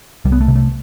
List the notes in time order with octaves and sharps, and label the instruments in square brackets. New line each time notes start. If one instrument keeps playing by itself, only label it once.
[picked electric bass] C2 G3
B3
A3
C3
A3